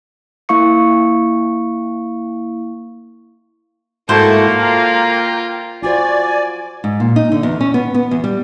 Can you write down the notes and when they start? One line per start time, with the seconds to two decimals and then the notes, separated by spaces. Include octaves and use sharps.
0.49 A#3 E4 F5 C#6 C#7
4.09 G#2 A3 A#3 E4 F#4 C5
4.62 F4 G5 A#5
5.83 F4 F#4 C5 D5 G#5
6.84 G#2
7.00 A#2
7.16 D#4
7.32 D3
7.43 E2
7.61 C#4
7.74 B3
7.95 B3
8.11 E2
8.24 G3